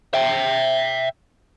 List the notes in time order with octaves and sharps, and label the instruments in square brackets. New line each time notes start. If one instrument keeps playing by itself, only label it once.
[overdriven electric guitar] E5 G5